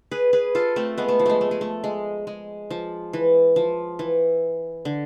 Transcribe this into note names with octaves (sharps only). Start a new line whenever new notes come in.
G#4 B4
G#4 B4
F4 A4
A3 C4
G#3 B3
A3
F3
G#3 A3
A3
G#3
A3
G#3
G#3
F3
E3
F3
E3
D3